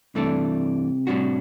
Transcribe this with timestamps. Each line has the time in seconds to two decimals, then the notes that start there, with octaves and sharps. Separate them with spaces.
0.15 G2 C3 E3 A3 D4
1.07 A2 G3 D4 F#4